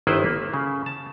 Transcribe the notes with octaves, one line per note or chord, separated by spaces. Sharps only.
G1 D#3 E4 B4 C5
A#3
C#3
A5